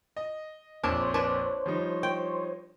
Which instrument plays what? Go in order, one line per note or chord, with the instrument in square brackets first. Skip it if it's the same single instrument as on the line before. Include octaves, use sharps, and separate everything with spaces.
[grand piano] D#5
[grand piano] A#1 F2 [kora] D4 [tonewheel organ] C5 C#5
[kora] D4 B4
[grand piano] F3 G3 D#4
[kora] G5